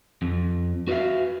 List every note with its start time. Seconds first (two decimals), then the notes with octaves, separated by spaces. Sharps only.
0.22 F2
0.88 F#4 B4 D5 E5 F5